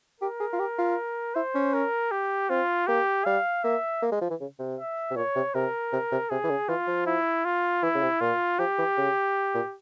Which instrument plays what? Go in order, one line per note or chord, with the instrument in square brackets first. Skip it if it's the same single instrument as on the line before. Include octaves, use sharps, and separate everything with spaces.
[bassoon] G4 [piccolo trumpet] A#4
[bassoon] G#4
F4
G4
F4
[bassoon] E4 [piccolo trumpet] C5
[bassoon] C#4
[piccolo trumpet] A#4
G4
[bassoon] C4 [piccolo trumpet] F4
[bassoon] A#3 [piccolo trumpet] G4
[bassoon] G3 [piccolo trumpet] F5
[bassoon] A#3 [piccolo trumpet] E5
[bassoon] A#3
G#3
F3
E3
C#3
C3
[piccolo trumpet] E5
[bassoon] C3
[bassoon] A#2 [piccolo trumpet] C#5
[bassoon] C3
[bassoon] C3 [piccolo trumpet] A#4
[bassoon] C3
C3
[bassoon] C3 [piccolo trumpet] G#4
[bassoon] E3
C#3
[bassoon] E3 [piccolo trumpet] F4
[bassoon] F3
[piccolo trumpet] E4
F4
[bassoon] E3 [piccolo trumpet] E4
[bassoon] C#3
C3
[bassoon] A#2 [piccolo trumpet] F4
[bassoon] F3 [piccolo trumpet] G4
[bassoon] E3
C#3
A#2